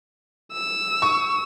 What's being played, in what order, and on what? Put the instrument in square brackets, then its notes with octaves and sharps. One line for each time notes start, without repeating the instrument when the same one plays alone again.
[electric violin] E6
[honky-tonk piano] C#6